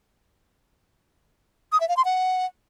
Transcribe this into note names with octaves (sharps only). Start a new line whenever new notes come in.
D#6
E5
F5
C6
F#5